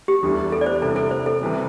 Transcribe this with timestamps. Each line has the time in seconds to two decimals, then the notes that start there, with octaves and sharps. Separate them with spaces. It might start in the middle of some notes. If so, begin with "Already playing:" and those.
0.08 G4
0.23 E2 D3 G3 E4
0.52 A4
0.61 D5
0.66 C5
0.82 C3 G3 E4 A4
0.96 A4
1.11 C5
1.26 A4
1.41 C3 E3 G3